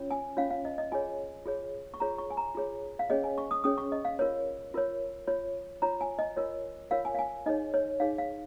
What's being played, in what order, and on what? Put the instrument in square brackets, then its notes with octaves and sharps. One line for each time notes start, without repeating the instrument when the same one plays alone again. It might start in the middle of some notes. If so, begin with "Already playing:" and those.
Already playing: [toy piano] C#4 F4 C#5
G#5
C#4 F4 C#5 F5
F5
D#5
D#5
F4 G#4 C#5 G#5
F4 G#4 C#5
C#6
F4 G#4 C#5 A#5
C#6
G#5
A#5
F4 G#4 C#5
F5
C#4 G#4 C#5 D#5
G#5
C#6
D#6
C#4 G#4 C#5 D#6
C#6
D#5
F5
F4 A#4 C#5
F4 A#4 C#5
F4 C#5
F4 C#5 A#5
G#5
D#5
F4 A#4 C#5
F4 A#4 C#5 F5
G#5
F5
G#5
D#4 G#4 C#5 D#5
C#5
D#4 G#4 C#5 F5
F5